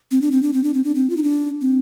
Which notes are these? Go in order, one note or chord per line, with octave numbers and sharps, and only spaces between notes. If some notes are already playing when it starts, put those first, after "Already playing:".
C4
D4
C4
D4
C4
D4
C4
D4
C4
F4
D#4
D4
C4